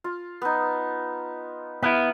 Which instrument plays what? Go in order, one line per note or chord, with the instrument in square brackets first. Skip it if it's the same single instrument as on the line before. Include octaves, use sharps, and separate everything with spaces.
[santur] F4
B3 D#4
[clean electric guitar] B3 E4 [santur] F5 B5